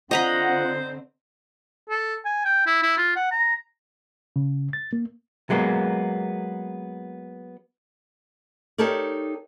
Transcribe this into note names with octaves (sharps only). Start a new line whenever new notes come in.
D3 C4 F4 C5 D#5 F#5 A#5 B5
A4
G#5
G5
E4
E4
F4
F#5
A#5
C#3
A6
A#3
F#3 G#3 A#3 B3
D#4 G4 A4 A#4 C#5 D5